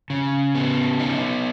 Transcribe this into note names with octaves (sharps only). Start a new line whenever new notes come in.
C#3
B3
D#4